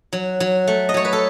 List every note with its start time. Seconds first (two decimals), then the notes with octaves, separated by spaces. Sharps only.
0.13 F#3
0.40 F#3
0.68 A3
0.89 D#5
0.94 F#3 C#5
1.05 B4
1.13 A4